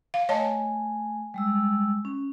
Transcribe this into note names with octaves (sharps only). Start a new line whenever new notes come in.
F5
A3 C#5 D#5 G#5 A5
G3 G#3 E6
C#4